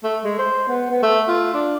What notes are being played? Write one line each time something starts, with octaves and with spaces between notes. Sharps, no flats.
A3
G#3
C5
B3
B3
A3
F4
D4